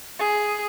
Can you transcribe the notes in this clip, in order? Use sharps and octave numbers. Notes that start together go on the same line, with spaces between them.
G#4